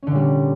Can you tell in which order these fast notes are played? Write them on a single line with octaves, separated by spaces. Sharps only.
C#4 D3 A#2 G3